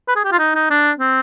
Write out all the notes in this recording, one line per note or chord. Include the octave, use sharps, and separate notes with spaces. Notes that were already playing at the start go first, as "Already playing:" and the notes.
B4
G#4
G4
F4
D#4
D#4
D4
C4